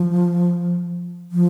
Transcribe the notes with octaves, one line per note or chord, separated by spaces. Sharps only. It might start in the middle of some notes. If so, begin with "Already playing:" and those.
Already playing: F3
F3